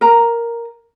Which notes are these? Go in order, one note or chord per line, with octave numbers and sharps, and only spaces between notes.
A#4 A#5